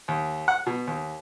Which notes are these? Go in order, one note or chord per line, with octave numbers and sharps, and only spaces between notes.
D#2
F#5
B2
D#2